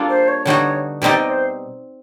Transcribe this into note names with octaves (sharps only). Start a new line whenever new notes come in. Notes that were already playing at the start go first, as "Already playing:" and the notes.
Already playing: G3 A#3 D4 F4 A4
C5
C#5
D3 G3 B3 D#4 F#4 C#5
B2 G3 C4 D#4 G4 D5
D#5
C5